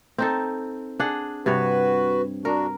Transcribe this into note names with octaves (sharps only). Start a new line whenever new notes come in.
C4 D#4 A4
D4 G#4 F#5
G2 C3 F#4 B4 C#5
D4 F#4 A#4